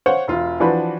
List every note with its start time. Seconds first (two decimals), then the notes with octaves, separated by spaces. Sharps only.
0.06 C5 C#5 F5 F#5
0.28 E1 F4
0.60 E3 F3 D4 F#4 B4